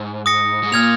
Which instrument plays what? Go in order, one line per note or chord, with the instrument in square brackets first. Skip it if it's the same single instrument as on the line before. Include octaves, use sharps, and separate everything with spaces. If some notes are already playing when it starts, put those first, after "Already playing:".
Already playing: [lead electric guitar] G#2
[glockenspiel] D#6 A#6 C#7
[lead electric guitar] G#2
[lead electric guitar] A#2 [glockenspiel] F6 G#6 F7